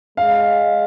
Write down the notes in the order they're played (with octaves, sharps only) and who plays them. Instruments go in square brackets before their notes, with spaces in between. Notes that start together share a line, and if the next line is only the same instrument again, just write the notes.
[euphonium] G#3 [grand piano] F5